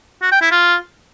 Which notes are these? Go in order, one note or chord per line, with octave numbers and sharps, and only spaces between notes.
F#4
G5
E4
F4